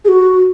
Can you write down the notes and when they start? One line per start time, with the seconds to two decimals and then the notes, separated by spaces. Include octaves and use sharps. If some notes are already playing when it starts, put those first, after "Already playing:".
0.05 G#4
0.08 F#4